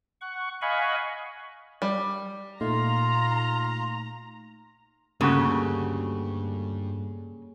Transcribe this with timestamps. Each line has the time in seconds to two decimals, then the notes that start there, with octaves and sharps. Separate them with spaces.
0.21 F#5 C#6
0.61 D#5 F5 F#5 G#5 B5 C#6
1.82 G3
2.61 A#2 A3 D#4 F4 F5 A#5 C6
5.21 D2 G2 C#3 A#3 F#4 G4 A4